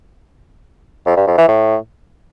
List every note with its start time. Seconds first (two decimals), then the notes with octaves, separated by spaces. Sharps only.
1.06 F2
1.17 G2
1.27 F2
1.38 E3
1.48 A2